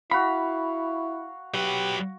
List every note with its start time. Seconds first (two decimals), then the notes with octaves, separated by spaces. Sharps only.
0.11 E4 F#4 F5 B5
1.54 F#3 G4 B4